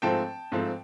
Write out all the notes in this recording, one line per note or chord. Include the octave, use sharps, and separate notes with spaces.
G#2 F3 A3 C4 G5 A5
G#2 F3 A3 C4